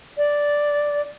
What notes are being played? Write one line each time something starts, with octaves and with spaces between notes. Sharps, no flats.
D5